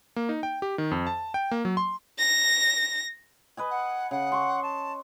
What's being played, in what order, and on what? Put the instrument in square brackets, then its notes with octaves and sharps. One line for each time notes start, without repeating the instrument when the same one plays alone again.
[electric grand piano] A#3
D#4
G5
G4
D#3
F2
A5
G5
A#3
F#3
C6
[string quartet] A#6
[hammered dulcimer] B4 D#5 G#5
[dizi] F#5
[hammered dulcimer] C#3 [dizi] F#5
[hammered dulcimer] C6 C#6
[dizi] A5